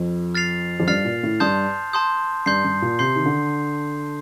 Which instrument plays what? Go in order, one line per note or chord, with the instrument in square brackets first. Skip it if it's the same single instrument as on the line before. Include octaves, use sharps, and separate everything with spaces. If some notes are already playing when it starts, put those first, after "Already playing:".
Already playing: [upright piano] F2
[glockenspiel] F6 A6 C7 F7
[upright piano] F2
[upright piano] G2 [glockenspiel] F6 A6 C7 F7
[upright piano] A#2
A2
[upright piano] G2 [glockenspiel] A5 C6 D#6 G6
[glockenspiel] A5 C6 D#6 G6
[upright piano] G2 [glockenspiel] C6 G6 C7
[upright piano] G2
A#2
[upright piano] C3 [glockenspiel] C6 G6 C7
[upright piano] D#3
D3